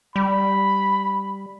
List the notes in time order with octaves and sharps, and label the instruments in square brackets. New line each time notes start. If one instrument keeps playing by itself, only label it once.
[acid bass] G3 [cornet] B5